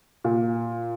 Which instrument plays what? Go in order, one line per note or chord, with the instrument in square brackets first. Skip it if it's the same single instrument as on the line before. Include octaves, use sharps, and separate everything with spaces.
[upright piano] A#2